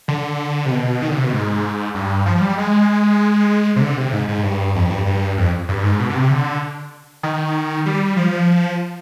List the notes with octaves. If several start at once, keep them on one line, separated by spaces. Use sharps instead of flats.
D3
C3
B2
D#3
D3
C3
B2
G#2
G2
F3
G3
G#3
C3
D3
C3
G#2
G#2
G2
F2
G2
G2
F2
G2
G#2
B2
D3
C3
D3
D#3
G3
F3